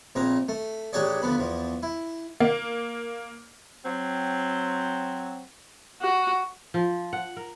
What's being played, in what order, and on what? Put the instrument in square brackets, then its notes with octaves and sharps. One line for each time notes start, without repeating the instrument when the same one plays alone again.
[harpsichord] A#1 C#3 C4 A#5
A3
A1 D4 G4 G#4 C#5 D5
D2 F3 B3 B5
E2 F3
E4
[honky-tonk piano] A#3
[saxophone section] F#3 C4
[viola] F#4
[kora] F3
F#5
A#4